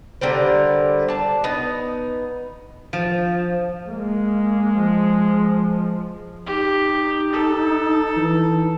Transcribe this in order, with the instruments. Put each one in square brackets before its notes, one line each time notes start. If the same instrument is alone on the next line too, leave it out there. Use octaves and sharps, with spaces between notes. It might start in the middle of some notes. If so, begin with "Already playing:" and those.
[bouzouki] D3 G3 A#4 C5
D4 A5
B3 D#4
[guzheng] F3
[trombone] G#3 [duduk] A#3
[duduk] F3
[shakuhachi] D#4 [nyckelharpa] G4
[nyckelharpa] A4
[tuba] E3